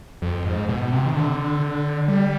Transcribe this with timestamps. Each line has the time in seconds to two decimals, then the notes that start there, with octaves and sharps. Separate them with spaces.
0.22 F2
0.45 G#2
0.69 B2
0.92 C3
1.06 D#3
1.16 D3
2.08 G3